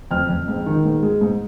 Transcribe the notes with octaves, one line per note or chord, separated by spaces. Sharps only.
F2 F6
F2
G#2
D#3
G#2
G#3
G#2